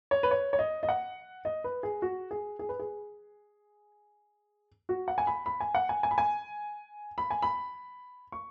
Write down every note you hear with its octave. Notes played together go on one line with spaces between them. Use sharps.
C#5
B4
C#5
C#5
D#5
D#5
F#5
D#5
B4
G#4
F#4
G#4
G#4
B4
G#4
F#4
F#5
G#5
B5
B5
G#5
F#5
G#5
G#5
B5
G#5
B5
G#5
B5
C#6